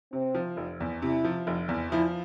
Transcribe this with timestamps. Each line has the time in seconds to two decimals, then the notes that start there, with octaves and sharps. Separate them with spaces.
0.13 C3 C4
0.35 F3
0.57 F1
0.80 E2
1.02 C3 E4
1.24 F3
1.47 F1
1.69 E2
1.91 F3 E4